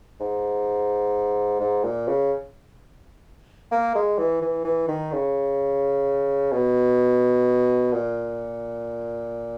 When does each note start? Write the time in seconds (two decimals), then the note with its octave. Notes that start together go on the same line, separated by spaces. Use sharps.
0.20 G#2
1.60 G#2
1.84 A#2
2.08 C#3
3.72 A#3
3.95 G#3
4.18 E3
4.42 E3
4.65 E3
4.88 D#3
5.12 C#3
6.52 B2
7.92 A#2